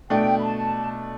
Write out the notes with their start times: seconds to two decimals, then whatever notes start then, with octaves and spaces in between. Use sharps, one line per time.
0.10 B2 A3 D4 G5
0.39 B5
0.43 A5